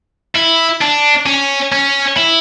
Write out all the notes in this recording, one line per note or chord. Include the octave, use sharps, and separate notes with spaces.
E4
D4
C#4
C#4
E4